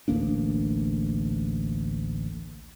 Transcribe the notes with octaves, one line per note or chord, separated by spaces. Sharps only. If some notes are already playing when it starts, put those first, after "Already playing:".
A1 D2 A#3 D4